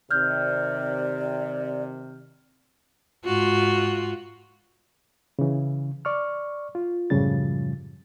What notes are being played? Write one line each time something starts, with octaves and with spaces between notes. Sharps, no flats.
C3 D#3 D5 F6 G6
G#2 F4 F#4
C#3 E3
D5 C#6 F6
F4
F#2 A2 C#3 F3 G3 A6